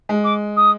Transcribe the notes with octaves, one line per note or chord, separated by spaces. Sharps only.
G#3
D6
D#6